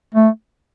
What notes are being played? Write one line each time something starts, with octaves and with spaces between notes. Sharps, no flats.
A3